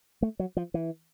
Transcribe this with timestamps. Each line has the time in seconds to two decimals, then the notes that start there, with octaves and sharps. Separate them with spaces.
0.22 A3
0.39 F#3
0.57 F3
0.74 E3